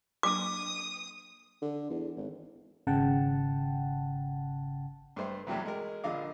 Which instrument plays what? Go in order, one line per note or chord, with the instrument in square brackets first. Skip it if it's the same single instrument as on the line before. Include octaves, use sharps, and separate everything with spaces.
[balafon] F#3 A#3 D4 [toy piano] D6 [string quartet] D#6
[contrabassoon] D3
E2
G#1
[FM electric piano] G#1 C#3 F#5 G5 A5
[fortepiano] G2 A3 C5
E2 C3 F#3 G3 A3
G#3 A#4
A#1 A#2 D3 D#5 F5 D6